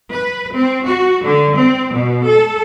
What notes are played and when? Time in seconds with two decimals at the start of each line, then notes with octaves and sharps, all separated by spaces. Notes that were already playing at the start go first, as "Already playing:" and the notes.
0.11 B4
0.56 C4
0.84 F#4
1.23 D3
1.57 C4
1.94 B2
2.26 A4